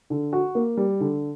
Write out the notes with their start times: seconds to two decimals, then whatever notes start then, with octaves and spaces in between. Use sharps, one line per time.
0.10 D3
0.33 F#4
0.55 A#3
0.77 G3
1.00 D3